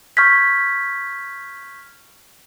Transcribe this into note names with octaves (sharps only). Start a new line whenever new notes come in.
C#6 F6 G6 G#6 B6